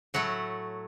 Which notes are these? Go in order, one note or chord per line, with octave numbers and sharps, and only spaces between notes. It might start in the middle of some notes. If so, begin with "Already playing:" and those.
A2 F#3 A3 F#5